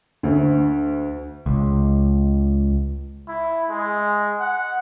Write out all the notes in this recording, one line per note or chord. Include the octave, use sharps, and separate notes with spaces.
D2
C#2
E4
G#3
F#5